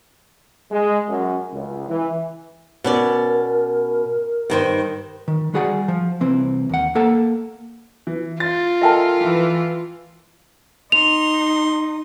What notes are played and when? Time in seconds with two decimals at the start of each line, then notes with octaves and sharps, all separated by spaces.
0.71 G#3
1.09 F#2
1.52 C#2
1.88 E3
2.84 B2 C#4 A#4 D5
4.50 G2 D#3 C5
5.28 D#3
5.54 G3 F#4 G#4 D5 F#5
5.88 F3
6.20 C2 E3 C4
6.69 D#2 F#5
6.95 A#3 A4 F#5
8.07 E3
8.40 F4 A6
8.82 A4 A#4 D#5 E5 G5 A5
9.20 E3
10.92 D#4 C6 F7